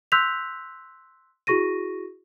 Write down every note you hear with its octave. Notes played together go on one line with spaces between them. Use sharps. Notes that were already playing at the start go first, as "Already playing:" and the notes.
C6 E6 F#6 G6 B6 F7
E4 F#4 G#4 C#6 A#6 D#7